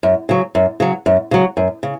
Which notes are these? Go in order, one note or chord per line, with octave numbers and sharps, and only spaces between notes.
F#2
C#3 F#3
F#2
C#3 F#3
F#2
C#3 F#3
F#2
C#3